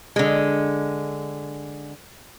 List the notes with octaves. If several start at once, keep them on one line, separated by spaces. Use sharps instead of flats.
D3 G#3